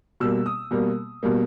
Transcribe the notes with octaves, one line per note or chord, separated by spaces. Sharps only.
B2 G3 A#3 E6
D#6
B2 G3 A#3
B2 G3 A#3